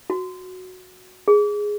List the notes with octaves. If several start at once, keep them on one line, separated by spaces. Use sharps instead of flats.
F#4
G#4